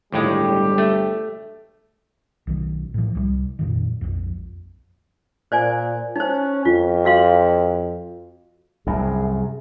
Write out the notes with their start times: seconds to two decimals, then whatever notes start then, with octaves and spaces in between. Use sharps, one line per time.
0.12 G1 D#2 A2 G3 G#3 G4
0.78 A3
2.47 B1 D#3
2.94 A2 F3
3.15 C2 E3 G3
3.59 F2 A#2 D#3
4.01 A#1 F2
5.52 A#2 C5 D5 G#5
6.16 C#4 D#4 C5
6.65 F2 F4
7.05 F#4 F5 C6
8.87 C2 F#2 G#4